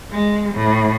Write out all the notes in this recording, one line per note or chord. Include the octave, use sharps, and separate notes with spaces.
G#3
A2